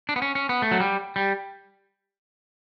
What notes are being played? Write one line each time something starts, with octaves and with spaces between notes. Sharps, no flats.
D4
B3
C#4
C#4
B3
A3
F#3
G3
G3